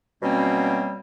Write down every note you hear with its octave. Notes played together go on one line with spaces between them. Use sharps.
B2 F#3 G3 A#3 C4 C#4